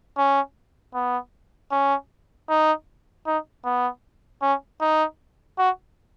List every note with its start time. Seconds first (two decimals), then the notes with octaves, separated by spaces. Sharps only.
0.17 C#4
0.95 B3
1.72 C#4
2.49 D#4
3.26 D#4
3.65 B3
4.42 C#4
4.81 D#4
5.58 F#4